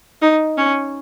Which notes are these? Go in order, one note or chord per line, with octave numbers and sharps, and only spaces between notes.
D#4
C#4